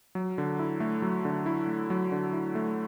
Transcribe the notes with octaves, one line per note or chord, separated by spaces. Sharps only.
F#3
D3
E4
A3
F#3
D3
E4
A3
F#3
D3
E4
A3